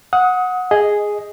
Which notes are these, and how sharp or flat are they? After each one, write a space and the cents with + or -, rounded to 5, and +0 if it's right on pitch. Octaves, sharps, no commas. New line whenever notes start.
F#5 -15 D#6 +25
G#4 +0 D#5 +0